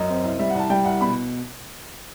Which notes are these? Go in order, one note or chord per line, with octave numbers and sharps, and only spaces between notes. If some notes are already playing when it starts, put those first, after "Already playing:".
Already playing: F#2 D#5
C4
C2
G3 E5
F#5
C2 A5
G3 G5
C2 F#5
B2 B5